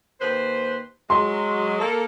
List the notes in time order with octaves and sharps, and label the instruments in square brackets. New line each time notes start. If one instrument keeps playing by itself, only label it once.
[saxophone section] D#2 B4 C5
[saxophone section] F#3 G#3 [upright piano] C6
[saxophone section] A#3 A4